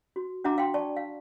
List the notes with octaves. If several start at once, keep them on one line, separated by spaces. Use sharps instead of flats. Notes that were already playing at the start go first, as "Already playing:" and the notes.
F#4
D4 F#4 E5 F#5 A#5 D6
F5 G5 C6
D5 A5 C#6
F5